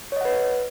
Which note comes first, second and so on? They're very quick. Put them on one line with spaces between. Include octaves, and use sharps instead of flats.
C#5 D#5 F#5 B4